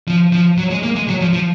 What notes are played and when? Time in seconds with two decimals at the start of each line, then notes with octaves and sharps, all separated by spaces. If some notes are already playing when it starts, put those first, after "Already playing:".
0.08 F3
0.32 F3
0.58 F#3
0.70 G#3
0.83 A#3
0.96 G#3
1.08 F#3
1.21 F3
1.33 F3